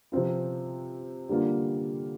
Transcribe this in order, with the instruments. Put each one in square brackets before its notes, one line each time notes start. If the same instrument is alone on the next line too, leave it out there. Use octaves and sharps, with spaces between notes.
[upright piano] C3 F3 C4 F4
D3 G3 A#3 F4